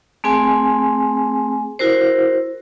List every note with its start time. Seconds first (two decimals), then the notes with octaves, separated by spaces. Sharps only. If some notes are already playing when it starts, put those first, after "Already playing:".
0.24 A3 C4 G#4 G#5
1.79 E4 F#4 A#4 C5